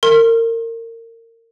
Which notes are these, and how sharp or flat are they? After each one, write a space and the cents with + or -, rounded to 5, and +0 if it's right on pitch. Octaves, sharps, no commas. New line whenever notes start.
A#4 -30 C6 +35